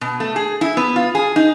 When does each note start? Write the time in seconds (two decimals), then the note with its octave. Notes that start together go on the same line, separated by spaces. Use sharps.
0.01 B2
0.20 A3
0.36 G#4
0.61 E4
0.77 B3
0.96 F4
1.15 G#4
1.36 D#4